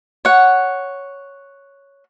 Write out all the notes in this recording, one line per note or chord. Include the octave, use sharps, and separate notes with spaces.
C#5 F#5